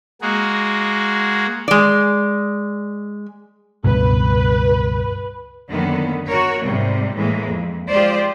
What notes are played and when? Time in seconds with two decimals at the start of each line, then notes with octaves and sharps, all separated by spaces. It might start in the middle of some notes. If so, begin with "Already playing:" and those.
0.21 G#3 A#3 F#4 G#4
1.68 G#3 D5
3.84 C#2 G2 B2 B4
5.70 F#2 D3 D#3 A#3 B3
6.28 F#4 A#4 C#5
6.62 G#2 C3 G3
7.17 A2 E3 G#3 A#3
7.47 F2
7.89 G#3 F4 G4 C5 D5